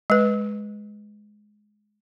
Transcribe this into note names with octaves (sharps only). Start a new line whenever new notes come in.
G#3 B4